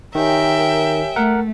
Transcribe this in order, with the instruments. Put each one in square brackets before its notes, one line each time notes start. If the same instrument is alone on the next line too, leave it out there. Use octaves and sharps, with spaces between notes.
[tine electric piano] D#3 [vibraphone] G4 C#5 G#5 [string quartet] A#4 [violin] E5 G5
[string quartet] A3 [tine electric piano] A#4 F#5